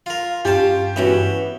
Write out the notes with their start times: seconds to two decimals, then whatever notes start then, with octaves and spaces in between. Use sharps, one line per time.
0.06 F4 A#4
0.45 G2 C#4 F4 G4 A5
0.96 E3 B3 C#4 F#4